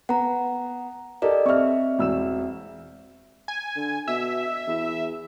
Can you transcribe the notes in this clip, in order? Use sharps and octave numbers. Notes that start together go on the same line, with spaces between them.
B3 F#5 A#5
G4 A4 A#4 D5 D#5
C4 E5 C#6 F6
E1 E6 E7
G#5
D3
B2 E5
E2